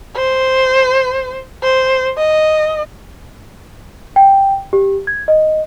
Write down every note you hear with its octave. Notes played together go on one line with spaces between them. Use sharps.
C5
C5
D#5
G5
G4
G#6
D#5